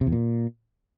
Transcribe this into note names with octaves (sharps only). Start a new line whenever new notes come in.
C3
E2
A#2